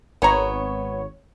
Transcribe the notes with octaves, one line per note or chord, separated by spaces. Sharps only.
G#1 B3 C#5 A#5